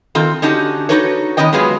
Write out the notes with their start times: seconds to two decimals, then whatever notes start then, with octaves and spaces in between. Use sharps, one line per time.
0.15 D#3 C4 F4 A4
0.42 D3 C#4 D#4 F#4 G4 A5
0.89 D#4 E4 F#4 A4 B4 C#5
1.37 D#3 G3 B3 C#4 D#5 G5
1.53 F#3 G#3 B3 F4 G#4 B4